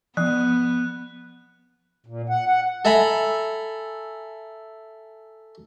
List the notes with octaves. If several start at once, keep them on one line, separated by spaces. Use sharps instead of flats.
F3 B3 F#6
A#2
F#5
F#5
A4 E5 G#5 A#5 B5